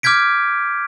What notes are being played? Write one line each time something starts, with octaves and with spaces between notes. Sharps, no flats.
D6 F6 G6 G#6 B6 D7